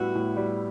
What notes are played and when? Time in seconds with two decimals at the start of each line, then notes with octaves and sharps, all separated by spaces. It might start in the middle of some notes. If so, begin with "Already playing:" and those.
Already playing: A2 G3 B3 E4 F#4
0.15 A2
0.37 G3